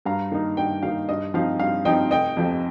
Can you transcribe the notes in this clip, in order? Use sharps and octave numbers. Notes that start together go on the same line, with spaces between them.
G2 F5 A#5
D#3 A#3 D#4
G2 D#5 G5
D#3 A#3 D#4 F5
G2 D#5
F3 C4 D#4 F5
G2 F5
F3 C4 D#4 D#5 G5
F1 D#5 G5
F2 F3 C4